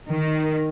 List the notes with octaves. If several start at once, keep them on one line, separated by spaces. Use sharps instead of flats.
D#3